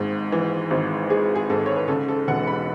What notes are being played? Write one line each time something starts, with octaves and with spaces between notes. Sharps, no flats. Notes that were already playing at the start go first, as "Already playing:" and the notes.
Already playing: G#1 G#2 G#3
E3
G#1
G#3 G#4
G#4
G#2 A4
C#5
B4
C#3 A4
A4
E1 F#5
B5